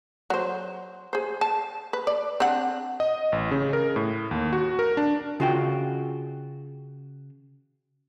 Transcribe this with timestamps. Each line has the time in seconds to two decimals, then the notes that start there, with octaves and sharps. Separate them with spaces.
0.30 F#3 C5
1.13 G#4 C5
1.41 A5
1.93 B4
2.07 D5
2.40 C4 D4 F#5
3.00 D#5
3.32 A1
3.51 C#3
3.73 A#4
3.96 A2
4.31 D#2
4.53 F#4
4.79 A#4
4.97 D4
5.40 C#3 F4 F#4 E5 G5